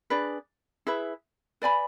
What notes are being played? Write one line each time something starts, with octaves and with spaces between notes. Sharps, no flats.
D4 G#4 B4 D5
E4 G#4 B4 E5
B4 D5 G#5 B5